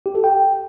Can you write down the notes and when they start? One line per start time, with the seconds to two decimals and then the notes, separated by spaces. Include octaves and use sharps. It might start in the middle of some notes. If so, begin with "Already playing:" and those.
0.06 G4
0.15 A4
0.24 G5